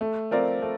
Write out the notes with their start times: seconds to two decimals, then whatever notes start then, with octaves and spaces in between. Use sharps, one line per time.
0.01 A3
0.31 C4 F4 A#4 D5
0.62 A3